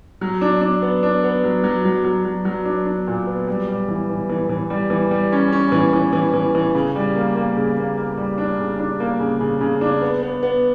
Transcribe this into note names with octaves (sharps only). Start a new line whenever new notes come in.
F#3
D4
D4
B3
D4
B3
F#3
F#3
F#3
F#3
F#3
F#3
D4
D4
A#2
B3
G3
G3
E3
E3
E3
E3
G3
E3
G3
C#4
C#4
E3
E3
E3
E3
E3
C#3
G3
A#3
A#3
C#3
A#3
A#3
G3
D4
C#3
D4
A#3
C#3
C#3
C#3
D4
B3
B3
B3